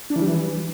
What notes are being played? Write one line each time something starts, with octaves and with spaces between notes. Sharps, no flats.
D4
E3
G3
E3